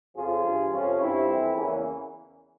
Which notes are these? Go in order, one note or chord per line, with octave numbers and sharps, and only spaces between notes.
F2 C#3 F3 F4 G#4
G2 E3
F2 C3 F3 C#4 F4
G2 F3 C4 E4
F2 E3
E2 C#3 E3 A#3 C#4